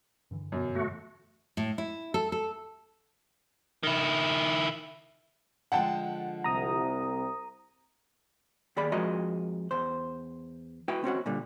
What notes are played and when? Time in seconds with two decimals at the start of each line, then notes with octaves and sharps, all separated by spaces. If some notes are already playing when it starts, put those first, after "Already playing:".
0.31 G2 D3 E3
0.52 F#2 B2
0.75 A3 F#4
1.57 A2
1.78 E4
2.14 A4
2.32 A4
3.83 D#3 E4
5.72 D3 F3 G#3 F#5 G5 A5
6.44 C2 C3 A#5 D#6
8.77 D#2 G#4 D5 B5
8.92 F2 G#3 F#4 A#4 D#5 A#5
9.71 E2 C5
10.88 E4 F#4 B4 G5
11.04 C4 C#4 F#4 F#5
11.26 A#2 D3 G3